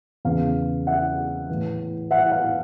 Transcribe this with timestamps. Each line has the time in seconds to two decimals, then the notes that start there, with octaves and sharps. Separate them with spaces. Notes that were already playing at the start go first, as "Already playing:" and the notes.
0.25 E2 C#3 E3 F5
0.87 E5 F#5
1.49 A2 E3
2.11 E5 F#5
2.32 F5